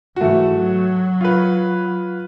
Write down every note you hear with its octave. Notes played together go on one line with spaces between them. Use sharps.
G#2 E3 A3 F#4
F#3
F4 B4